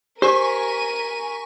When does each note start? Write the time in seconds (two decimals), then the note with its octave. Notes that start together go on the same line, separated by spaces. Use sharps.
0.22 G4 A#4 C5 G#5 C#6 B6 D#7